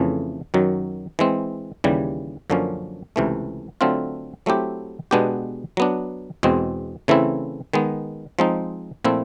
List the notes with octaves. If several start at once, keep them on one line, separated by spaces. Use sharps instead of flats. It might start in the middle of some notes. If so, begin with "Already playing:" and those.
Already playing: F2 C#3 E3 A3
F#2 D#3 F#3
E3 G#3 C4
D#2 C#3 E3 G3
F#2 D3 F3 A#3 C#4
C#2 C3 E3 A3
D3 F#3 A3 C4 F4
F#3 A3 C4 E4 G4
B2 G#3 B3 D4 G4
F#3 B3 D4
E2 B2 G#3 C4
C#3 E3 A3 C4 E4
D#3 G#3 B3
F3 G#3 C4 D#4
A#2 F3 A3 C4 E4